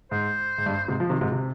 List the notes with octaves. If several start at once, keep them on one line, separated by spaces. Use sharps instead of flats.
G#2 C5
G#2
G2
G#2 C3
F3
C3 D#3
G#2 C3
C3